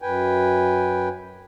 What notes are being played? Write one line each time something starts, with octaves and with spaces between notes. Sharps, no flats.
F#2 B4 G5 G#5